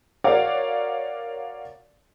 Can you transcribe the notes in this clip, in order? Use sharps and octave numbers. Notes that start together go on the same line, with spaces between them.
F#4 A#4 C#5 D5 F5 F#5